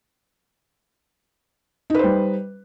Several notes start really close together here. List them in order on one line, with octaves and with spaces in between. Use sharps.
D#4 B4 C5 G3